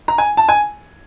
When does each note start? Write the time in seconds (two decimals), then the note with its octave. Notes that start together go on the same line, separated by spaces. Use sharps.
0.08 A#5
0.18 G#5
0.37 A5
0.49 G#5